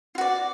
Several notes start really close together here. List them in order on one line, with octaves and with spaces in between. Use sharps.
F4 F#4 D5